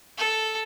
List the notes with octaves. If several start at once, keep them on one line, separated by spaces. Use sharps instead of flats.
A4